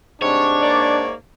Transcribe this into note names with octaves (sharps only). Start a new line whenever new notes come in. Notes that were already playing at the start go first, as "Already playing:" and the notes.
G#2 C3 G3 D4 C#5
A#3 D5